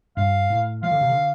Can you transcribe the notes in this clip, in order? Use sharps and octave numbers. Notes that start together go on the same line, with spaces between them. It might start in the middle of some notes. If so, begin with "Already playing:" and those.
G2 F5
A2
F3 F5
D3
C3
D3